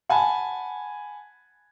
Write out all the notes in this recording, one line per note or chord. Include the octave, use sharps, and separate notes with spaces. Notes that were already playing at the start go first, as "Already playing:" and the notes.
F#5 G#5 A5 B5